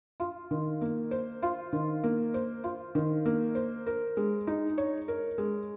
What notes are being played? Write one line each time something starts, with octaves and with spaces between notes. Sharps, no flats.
F4
D#3
A#3
C5
F4
D#3
A#3
C5
F4
D#3
A#3
C5
A#4
G#3
D#4
C#5
A#4
G#3